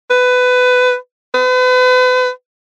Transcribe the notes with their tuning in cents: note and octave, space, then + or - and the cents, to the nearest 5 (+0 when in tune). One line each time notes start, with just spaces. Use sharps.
B4 +20
B4 +40